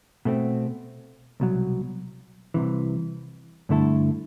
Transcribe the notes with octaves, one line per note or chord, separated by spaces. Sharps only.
B2 A3 C4
C2 B2 F#3
C2 C3 E3
G2 D3 A3 E4 A4